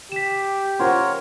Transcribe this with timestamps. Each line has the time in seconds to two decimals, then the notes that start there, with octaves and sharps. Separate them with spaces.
0.12 G4 B6 E7
0.80 C#4 F4 A#4 C5 C#5 F#5 C6